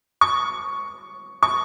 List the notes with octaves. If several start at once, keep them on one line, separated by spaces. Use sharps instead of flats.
C#6
C#6